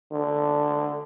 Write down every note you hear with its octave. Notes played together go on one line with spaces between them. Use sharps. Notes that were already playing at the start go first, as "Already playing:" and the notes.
D3